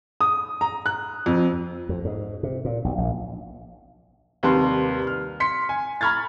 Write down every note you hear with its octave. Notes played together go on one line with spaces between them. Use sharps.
D#6
A#5
F#6
F2
F2
G#2
C3
A#2
B1
A#1
D#2 C3 G3 B4 A5 C6
F6
C6 B6 C#7
G#5
A#5 B5 C#6 F6 G#6 A6